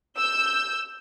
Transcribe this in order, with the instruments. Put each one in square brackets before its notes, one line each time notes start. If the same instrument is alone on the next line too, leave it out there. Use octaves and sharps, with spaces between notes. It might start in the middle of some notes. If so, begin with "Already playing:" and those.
[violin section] E6 G6